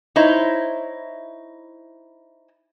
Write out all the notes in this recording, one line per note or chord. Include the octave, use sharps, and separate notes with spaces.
D#4 E4 C5 C#5